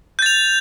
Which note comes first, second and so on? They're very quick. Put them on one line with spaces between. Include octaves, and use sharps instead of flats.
G6 A6 F7